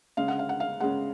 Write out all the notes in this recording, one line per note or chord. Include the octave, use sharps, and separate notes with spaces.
C#3 G#3 F5
F#5
F5
F#5
F5
C#3 G#3 F#5